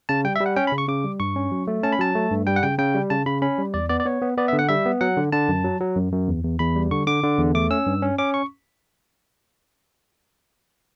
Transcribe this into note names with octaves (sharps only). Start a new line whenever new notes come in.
C#3 A5
G3 G5
E5
G3
F#5
C#4 G5
B5
C#3
C#6
C#3 D6
G3
G2 C#6
C#4
F#3
A3
C#4 A5
B5
F#3 A5
A3
G2
G3 G5
F#5
C#3 G5
C#3 G5
G3
C#3 A5
C#3 B5
C#4 B5
G3
E2 D5
B3 D5
D5
B3 C#5
B3
B3 D5
E5
D3
F#5
G3 E5
B3
F#3 F#5
D3
D3 A5
F#2
F#3
F#3
F#2
F#2
E2
E2
E2 B5
G3
D3 C#6
D3 D6
D3
E2
A3 D6
C#4 E6
G2
C#4
C#4 D6
C#6